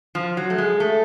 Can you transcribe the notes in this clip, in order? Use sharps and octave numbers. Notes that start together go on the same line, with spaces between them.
F3
F#3
A3
G#3
A3